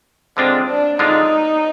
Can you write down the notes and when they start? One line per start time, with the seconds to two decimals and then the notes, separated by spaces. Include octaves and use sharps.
0.37 D3 G#3 C4 D4 F4
0.68 D4
0.99 D3 G#3 D4 D#4 F4